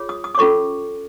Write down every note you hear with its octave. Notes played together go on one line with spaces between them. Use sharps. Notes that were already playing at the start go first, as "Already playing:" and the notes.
Already playing: F4 G#4 C#5
D#6
D#6
D6
C#4 F4 A4 C#5 C#6